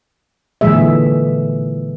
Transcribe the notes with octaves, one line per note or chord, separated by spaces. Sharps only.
A#2 D3 E3 G#3 G#4 E5